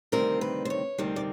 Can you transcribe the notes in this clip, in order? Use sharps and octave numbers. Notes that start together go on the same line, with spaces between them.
D2 C3 D#3 G3 C4 A#4
B4
C5
C#5
D2 C3 D#3 G3 C4
D5